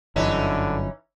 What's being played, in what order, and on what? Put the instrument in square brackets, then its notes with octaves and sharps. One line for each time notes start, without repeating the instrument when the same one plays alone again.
[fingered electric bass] G1 F#2 [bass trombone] D3 [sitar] E3 C#4 D#4